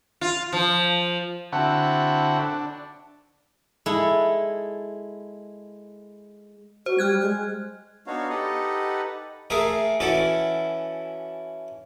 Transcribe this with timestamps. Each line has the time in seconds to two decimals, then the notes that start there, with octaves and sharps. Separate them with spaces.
0.21 F4
0.53 F3
1.52 D3 C4 E4 F#4 A4 F#5
2.39 D4
3.86 G#3 E4 A4
6.86 F#4 C5
6.98 G3 F6 F#6 G#6
7.22 G#3
8.07 B3 D4 D#4 F#4 C#5 F5
8.29 D#4 G4 A4 B4 D#5 F#5
9.50 A3 G#4 A#4 E5 F5
10.00 E3 C#4 E4 F#4 A4 D5